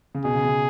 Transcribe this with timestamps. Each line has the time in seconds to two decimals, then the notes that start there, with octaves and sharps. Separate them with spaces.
0.15 C#3
0.25 B2 G#4
0.35 C#3
0.45 C#3